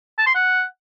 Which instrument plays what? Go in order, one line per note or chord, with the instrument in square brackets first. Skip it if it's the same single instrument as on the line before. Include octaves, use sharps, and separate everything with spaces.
[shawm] A5
C6
F#5